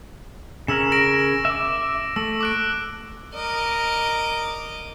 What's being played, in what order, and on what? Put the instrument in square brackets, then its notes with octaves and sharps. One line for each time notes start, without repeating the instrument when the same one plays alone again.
[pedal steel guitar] C#3 C#4 A#4 [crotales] E6 E7
[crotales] A#6 D7
[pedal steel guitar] E5 D6
[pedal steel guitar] A3 [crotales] E6
[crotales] D6 F#6 D7
[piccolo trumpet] A#4 [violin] D#5 D6